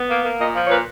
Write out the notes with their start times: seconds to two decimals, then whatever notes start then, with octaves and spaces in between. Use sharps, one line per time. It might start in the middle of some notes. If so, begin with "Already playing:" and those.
Already playing: B3
0.09 A#3
0.24 A#3
0.39 A#2 D#5
0.54 F3
0.65 C#5
0.69 A#2 B4